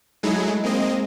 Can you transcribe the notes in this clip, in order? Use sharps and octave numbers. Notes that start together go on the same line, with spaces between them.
F#3 G#3 A3 D#4 E4 G#4
G#3 A#3 C4 D#5